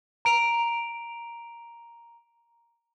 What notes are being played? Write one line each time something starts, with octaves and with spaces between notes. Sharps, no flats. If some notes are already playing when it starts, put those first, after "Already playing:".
A#5 D7 F7